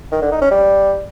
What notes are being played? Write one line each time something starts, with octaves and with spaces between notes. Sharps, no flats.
D#3
D3
D#4
C#4
G3